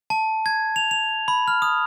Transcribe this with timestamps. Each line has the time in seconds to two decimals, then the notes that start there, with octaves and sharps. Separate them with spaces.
0.10 A5
0.46 G#6
0.76 F7
0.91 F7
1.28 B5
1.48 F6
1.62 D#6